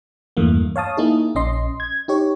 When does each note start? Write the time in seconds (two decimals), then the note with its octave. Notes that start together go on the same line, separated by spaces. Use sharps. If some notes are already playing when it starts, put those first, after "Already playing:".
0.37 E2 G2 E3 A3 A#3
0.76 C#5 F5 A5 D#6
0.97 A#3 D#4 E4 G#4
1.35 A#1 C#4 D#5 C6
1.80 G#6
2.08 D#4 G4 C#5